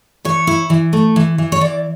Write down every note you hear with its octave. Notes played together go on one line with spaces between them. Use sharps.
E3 C#5
E4
E3
A3
E3
E3
C#5
E3 D5